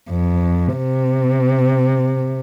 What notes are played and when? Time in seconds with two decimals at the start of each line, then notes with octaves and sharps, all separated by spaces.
0.10 F2
0.76 C3